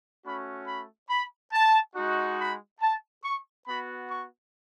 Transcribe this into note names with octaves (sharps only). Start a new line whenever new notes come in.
A3 C#4 F#4 B5
B5
B5
A5
G#3 D#4 F#4
B5
A5
C#6
B3 F#4 B5
C#6